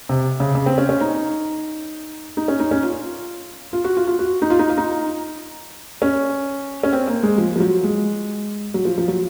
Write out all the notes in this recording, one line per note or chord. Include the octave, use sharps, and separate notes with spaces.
C3
C#3
C#3
C4
C#4
C#4
D#4
D#4
C#4
D#4
C#4
F4
F4
F#4
F4
F4
F#4
D#4
F4
D#4
F4
D#4
C#4
C#4
C4
A#3
G#3
F3
F3
F#3
G#3
F#3
F3
F3
F#3